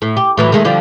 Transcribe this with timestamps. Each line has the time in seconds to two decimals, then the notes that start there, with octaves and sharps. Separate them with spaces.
0.02 A2
0.17 G4
0.37 A2 E3 F#3
0.52 D#3 G#3 A3
0.65 D3 F3 G3